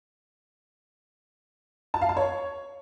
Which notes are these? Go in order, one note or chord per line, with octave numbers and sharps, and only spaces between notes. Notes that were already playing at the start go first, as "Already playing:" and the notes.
A5
F5
A5
C#5